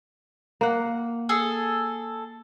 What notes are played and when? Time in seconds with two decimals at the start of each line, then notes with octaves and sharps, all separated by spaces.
0.61 A#3 F#5
1.29 G#4 A4